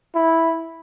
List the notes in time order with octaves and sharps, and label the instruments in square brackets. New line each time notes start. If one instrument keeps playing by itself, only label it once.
[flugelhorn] E4